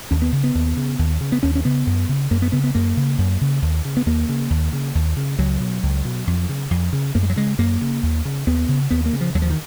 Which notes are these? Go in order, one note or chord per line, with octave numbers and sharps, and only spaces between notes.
D#2 C#4
B3
C#3
B3
D#2
C#3
D#2
C#3
B3
D#2 C#4
C#4
C#3 B3
F#2
C#3
F#2 A#3
B3
C#3 B3
B3
F#2 A#3
C#3
F#2
C#3
D#2
C#3
B3
D#2 A#3
C#3
D#2
C#3
D#2
C#3
C#2 F#3
B2
C#2
B2
F2
C#3
F2
C#3
F#2 A#3
G#3
F#3
C#3 G#3
F#2 A#3
C#3
D#2
C#3
D#2 B3
C#3
D#2 B3
A#3
C#3
F3
D#2 F#3
F3
D#3